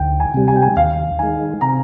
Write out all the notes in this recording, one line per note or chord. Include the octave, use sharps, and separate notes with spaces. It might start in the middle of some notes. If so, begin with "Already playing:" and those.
Already playing: D2 G5
G#5
C3 G3
G#5
G5
G#5
D#2 F5
D#3 G#3 G#5
C3 A#5